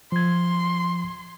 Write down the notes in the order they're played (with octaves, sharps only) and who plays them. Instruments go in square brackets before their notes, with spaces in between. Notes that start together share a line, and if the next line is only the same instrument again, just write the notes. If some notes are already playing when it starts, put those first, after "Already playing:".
[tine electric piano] F3 G#6 [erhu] C6